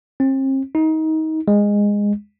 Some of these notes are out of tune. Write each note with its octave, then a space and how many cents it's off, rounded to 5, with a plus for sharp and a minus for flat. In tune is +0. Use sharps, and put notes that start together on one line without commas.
C4 +40
D#4 +25
G#3 -15